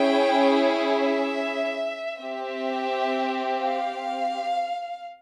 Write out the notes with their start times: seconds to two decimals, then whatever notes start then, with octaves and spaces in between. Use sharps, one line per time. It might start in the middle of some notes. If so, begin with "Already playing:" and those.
Already playing: C#4 E4 G#4 G5
0.83 E5
2.21 C4 G4 E5
3.59 F5